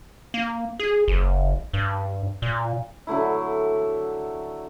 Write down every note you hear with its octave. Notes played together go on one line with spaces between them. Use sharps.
A#3
G#4
F#1
G2
A#2
D3 F#3 A3 E4